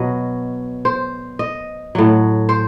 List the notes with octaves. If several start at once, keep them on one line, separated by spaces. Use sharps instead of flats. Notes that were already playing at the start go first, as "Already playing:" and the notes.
Already playing: B2 F#3 D#5
C5
D#5
A2 F#3
C5